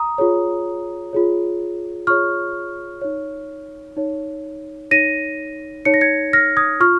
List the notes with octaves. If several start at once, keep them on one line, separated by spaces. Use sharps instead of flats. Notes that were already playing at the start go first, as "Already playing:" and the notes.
Already playing: A#5 D#6
F4 G#4 C#5
F4 G#4 C#5
F4 G#4 C#5 C#6 F6
D#4 C#5
D#4 C#5
D#4 C#5 A#6 D#7
D#4 C#5 C#7
A#6
G#6 C#7
F6 A#6
D#6 G#6
F4 C#6 F6